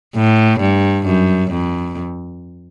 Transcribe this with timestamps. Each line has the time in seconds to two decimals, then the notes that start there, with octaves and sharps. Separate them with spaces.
0.16 A2
0.60 G2
1.06 F#2
1.51 F2